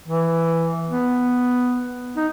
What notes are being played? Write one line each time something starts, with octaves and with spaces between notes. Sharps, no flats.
E3
B3
D#4